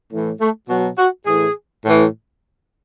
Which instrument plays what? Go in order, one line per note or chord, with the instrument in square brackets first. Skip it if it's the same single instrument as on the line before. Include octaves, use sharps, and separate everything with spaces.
[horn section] A2 E3
A3
B2 F#3 F#4
F#4
A2 E3 G#4
A2 E3